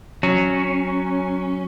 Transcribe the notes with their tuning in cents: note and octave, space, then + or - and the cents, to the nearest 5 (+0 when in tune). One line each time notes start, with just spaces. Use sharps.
F#3 +0 C#4 +0